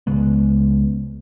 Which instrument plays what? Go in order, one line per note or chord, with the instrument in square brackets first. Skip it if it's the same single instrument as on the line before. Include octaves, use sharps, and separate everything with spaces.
[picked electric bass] C#2 C#3 G#3 B3